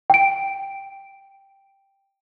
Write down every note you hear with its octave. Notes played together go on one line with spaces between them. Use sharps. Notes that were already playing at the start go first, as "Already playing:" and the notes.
G5 D7